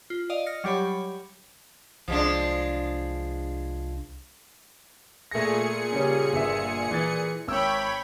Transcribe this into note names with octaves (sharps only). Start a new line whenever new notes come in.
F4
D5 D#5 F5 D#6
F6 A#6 C#7
F#3 G3 G4 C#5 B5
C2 F3 G#3 D4
A#2 A3 G#4 A#6 C#7
C#3 G3 C#4
G1 E5
E3 A6
G#1 C#5 G5 B5 E6